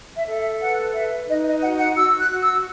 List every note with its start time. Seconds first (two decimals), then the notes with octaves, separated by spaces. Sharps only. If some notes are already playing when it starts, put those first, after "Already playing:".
0.16 E5
0.27 A4
0.38 E5
0.60 B4 F#5
0.94 B4 E5
1.28 D#4 D#5
1.45 D#5
1.61 F#4 F#5
1.78 F#5
1.96 F#4 E6
2.18 F#6
2.28 F#4
2.40 E6